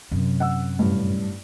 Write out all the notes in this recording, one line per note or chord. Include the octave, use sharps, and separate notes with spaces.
F#2 C3
F#5 E6
A1 G2